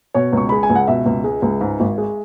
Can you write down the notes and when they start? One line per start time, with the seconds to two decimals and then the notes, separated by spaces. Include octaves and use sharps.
0.14 B2 C#5
0.33 C#2 C#6
0.49 G#3 B5
0.63 G#5
0.70 C#2
0.75 F#5
0.88 B2 E5
1.06 C#2
1.24 G#3
1.42 C#2
1.61 G#2
1.80 G#1
1.98 G#3